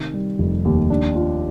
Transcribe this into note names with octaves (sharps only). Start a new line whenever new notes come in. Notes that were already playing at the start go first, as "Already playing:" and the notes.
Already playing: C3 D#3
G3
F1
D#2
D4
F4